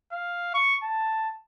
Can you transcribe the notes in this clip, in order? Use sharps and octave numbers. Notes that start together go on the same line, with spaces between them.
F5
C#6
A5